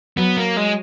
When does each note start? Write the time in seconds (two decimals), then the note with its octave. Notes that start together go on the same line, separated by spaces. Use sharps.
0.17 F#3 B3
0.37 A#3
0.57 G#3